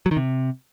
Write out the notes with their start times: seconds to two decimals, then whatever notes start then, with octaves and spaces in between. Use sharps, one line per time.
0.06 F#3
0.11 D#3
0.17 C3